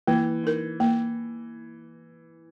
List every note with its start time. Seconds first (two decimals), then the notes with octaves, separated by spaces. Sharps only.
0.07 E3 A#3
0.44 D#4 A#4
0.80 A#3